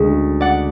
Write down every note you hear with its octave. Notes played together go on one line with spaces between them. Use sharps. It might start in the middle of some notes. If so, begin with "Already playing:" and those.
Already playing: D2 C#3 G#3 D4
D5 F#5